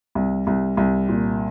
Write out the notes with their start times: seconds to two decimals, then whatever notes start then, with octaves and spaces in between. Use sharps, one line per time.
0.15 C2
0.47 C2
0.77 C2
1.09 A#2